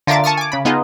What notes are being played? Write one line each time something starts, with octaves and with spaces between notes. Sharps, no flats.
D3 F4 A#4 E5 D6 A6
A5 C#6 D#6 F6
G#5 D6
C#3 B5
B3 D#4 F4 G#4 D#5